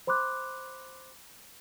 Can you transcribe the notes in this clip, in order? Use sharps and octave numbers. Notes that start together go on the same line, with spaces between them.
C5 B5 C6 D6 F#6